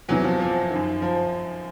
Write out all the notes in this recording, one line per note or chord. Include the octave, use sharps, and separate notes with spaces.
E2 C3 E3 F#3
F3
F3
F#2 D#3
F3